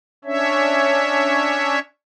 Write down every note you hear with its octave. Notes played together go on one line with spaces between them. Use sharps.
C#4 D4 C#5 E5